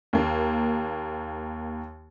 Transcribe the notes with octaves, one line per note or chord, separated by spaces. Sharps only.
D#2 A#3